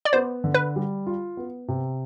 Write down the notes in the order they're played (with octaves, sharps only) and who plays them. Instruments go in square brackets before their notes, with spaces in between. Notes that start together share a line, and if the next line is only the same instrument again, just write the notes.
[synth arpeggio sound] D5
[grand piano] B3 [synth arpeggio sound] C5
[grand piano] D3
[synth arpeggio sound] B4
[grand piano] G3
F4
B3
C3